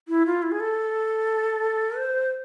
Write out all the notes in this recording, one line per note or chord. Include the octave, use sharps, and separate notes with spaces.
E4
F4
E4
G#4
A4
C5